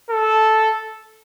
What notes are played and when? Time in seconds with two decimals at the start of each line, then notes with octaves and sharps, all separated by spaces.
0.11 A4